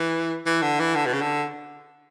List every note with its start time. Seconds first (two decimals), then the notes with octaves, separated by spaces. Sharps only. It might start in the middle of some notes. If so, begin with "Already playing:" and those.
Already playing: E3
0.46 E3
0.62 D3
0.79 E3
0.95 D3
1.06 B2
1.13 C#3
1.21 D3